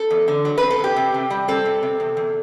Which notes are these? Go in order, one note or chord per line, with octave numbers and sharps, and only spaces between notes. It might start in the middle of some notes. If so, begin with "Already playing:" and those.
Already playing: A4
E2
D3
F#3
C4 B4
A4
E2 G4
C3
C3
G3
C4 A4
C3
C3
E2
E2